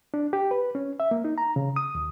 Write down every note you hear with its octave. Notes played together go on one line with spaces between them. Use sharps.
D4
G4
B4
C#4
E5
A#3
D#4
A#5
C#3
D#6
D#2